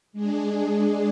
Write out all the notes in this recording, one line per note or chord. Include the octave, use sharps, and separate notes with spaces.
G#3 D4 G#4